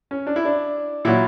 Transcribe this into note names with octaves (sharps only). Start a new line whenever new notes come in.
C#4
D4
E4
D4
A#2 F#3 E4